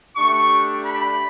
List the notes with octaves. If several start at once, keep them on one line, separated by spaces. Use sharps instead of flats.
A3 D4 G4 C#6
B5